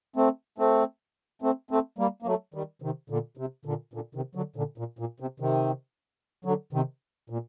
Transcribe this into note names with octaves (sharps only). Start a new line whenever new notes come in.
A3 C4
A3 C4
A3 C4
A3 C4
G3 A#3
A#3
F#3 A3
D#3 G3
C3 D#3
A#2 D3
C3
A#2 D3
A#2 D3
C3 D#3
D3 F#3
A#2 D3
A#2
A#2
C3
C3 D#3
D3 F#3
C3 D#3
A#2